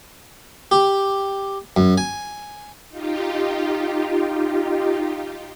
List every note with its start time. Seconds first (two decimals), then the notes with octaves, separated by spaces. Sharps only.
0.71 G4
1.77 F#2
1.98 G#5
2.90 D#4 F4 G4